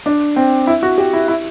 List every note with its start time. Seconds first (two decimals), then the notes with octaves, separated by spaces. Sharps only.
0.06 D4
0.36 C4
0.67 E4
0.83 F#4
0.98 G4
1.13 E4
1.28 E4